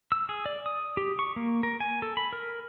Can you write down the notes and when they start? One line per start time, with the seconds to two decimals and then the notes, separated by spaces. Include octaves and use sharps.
0.12 E6
0.29 G#4
0.46 D5
0.66 D#6
0.97 G4
1.19 C#6
1.36 A#3
1.63 A#4
1.80 G#5
2.02 A4
2.17 B5
2.33 A#4